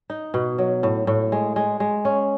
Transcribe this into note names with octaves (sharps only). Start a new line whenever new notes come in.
D#4
B2
F#3
A2
A2
G#3
G#3
G#3
C#4